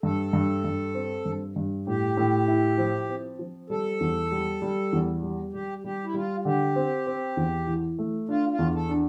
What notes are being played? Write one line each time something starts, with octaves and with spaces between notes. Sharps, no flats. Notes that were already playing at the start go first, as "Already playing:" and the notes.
G2 A4
G2
G2
C4
G2
G2
A2 G4
A2
E4
F3
C4
F3
G3 A4
E2
G3
G3
E2
G3
G3 G4
G3 G4
E4
G3 F4
D3 G4
C4
C4
E2
E3
A3
D4 F4
F4
E2
A4
D4